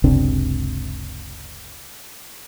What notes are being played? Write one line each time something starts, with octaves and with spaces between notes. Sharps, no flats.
F#1 C#2 C3 D4